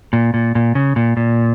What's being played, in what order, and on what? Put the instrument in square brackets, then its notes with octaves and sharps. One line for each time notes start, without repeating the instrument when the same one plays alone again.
[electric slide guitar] A#2
A#2
A#2
C#3
A#2
A#2